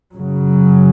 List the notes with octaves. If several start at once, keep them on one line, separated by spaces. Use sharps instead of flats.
F#2 C#3 F#3